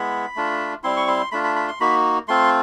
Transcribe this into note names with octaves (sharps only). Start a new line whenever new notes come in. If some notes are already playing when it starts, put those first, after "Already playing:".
Already playing: G#3 B3 E4 B5
A3 D4 F4
G3 C4 E4 C6
C#6
C6
A3 D4 F4 B5
B5
B5
C6
A#3 D#4 F#4 B5
A3 C4 F4 C6